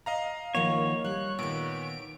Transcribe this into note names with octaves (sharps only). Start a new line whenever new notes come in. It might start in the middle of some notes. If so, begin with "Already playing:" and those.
D#5 F5 A#5
D#3 F3 A#3 C#5 F#5
G3 F#6
A#2 D#3 B3 D7